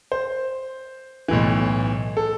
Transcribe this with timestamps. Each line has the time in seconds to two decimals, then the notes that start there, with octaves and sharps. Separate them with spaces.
0.12 C5
1.28 B1 A2 E3
2.17 A4